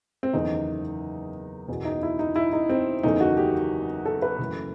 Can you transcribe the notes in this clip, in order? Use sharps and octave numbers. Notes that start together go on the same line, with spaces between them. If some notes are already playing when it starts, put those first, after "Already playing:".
C4
F#1 E2 D#3 A3 D#4
F#1 E2 B2
D#4
E4
D#4
E4
D#4
C4
F#1 E2 D#3 A3 D#4
F#4
G4
A4
B4
F#1 F#2 E3 A3